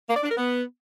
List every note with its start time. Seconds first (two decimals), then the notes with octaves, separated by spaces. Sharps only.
0.09 A#3
0.16 D5
0.23 D4
0.30 A#4
0.37 B3